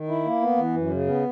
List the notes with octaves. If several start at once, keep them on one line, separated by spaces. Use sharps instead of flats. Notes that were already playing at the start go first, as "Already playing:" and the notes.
Already playing: D#3
E4
A#3
B3
E3
F#2
C#3
B3